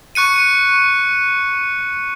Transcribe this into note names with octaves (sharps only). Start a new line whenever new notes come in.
C#6 F#6 C#7 D#7